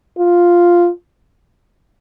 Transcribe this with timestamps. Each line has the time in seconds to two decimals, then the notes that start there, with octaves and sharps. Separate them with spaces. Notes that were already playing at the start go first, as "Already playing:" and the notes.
0.18 F4